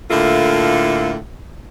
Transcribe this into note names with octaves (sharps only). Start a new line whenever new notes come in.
A2 D3 A#3 E4 F4 A4